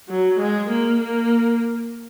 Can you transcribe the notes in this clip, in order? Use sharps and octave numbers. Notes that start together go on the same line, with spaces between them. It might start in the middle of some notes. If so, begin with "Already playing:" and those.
F#3
G#3
A#3
A#3